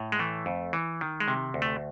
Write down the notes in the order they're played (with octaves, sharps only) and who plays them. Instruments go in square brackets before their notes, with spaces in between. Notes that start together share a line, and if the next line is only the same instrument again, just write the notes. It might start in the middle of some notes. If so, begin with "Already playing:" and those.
Already playing: [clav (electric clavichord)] A2
G#3
E3 A3
F2
E3
D#3
G#3
C3
D2
A3